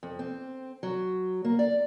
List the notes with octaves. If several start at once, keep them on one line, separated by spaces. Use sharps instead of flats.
F2
C4
F#3
A#3
D5